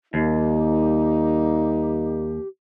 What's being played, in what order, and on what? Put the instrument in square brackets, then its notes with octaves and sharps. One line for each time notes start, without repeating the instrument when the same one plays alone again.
[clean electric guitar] D#2 [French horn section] G3 A#3 D#4 [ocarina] G4